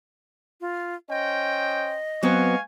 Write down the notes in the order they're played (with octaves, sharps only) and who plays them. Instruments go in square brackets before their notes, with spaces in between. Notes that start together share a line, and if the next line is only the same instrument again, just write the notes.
[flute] F4
[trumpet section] C#4 C5 G5 [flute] D#5
[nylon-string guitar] F#3 B3 C4 [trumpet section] F5 G#5 C#6